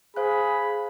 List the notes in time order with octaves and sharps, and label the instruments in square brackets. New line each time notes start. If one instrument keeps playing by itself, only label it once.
[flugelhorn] G#4 [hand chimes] C5 F5 F#6 [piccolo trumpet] B5